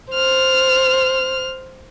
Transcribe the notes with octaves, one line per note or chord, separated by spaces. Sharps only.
C5 F6